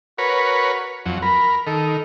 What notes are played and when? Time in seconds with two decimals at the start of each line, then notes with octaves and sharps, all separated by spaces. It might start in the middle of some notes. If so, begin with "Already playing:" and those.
0.18 F#4 A#4 B4 C#5
1.06 F2 F#3 F#5
1.22 A#4 B5
1.67 D#3 A4